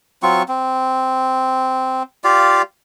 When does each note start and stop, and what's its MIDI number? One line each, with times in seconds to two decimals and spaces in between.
0.23 0.43 54
0.23 0.43 60
0.23 0.43 65
0.23 0.43 85
0.48 2.03 60
2.24 2.62 65
2.24 2.62 67
2.24 2.62 74
2.24 2.62 77